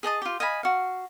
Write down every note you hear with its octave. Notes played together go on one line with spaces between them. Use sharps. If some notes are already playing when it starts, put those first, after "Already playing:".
G#4 D#5 A5 D#6
F4 G4
D#5 F5 G#5 B5
F#4 F5